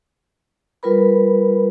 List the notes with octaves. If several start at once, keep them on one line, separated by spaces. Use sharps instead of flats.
G3 F4 A#4 B4 B5